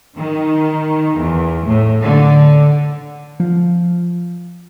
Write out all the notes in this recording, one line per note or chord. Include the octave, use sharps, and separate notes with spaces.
D#3
E2
A2
D3
F3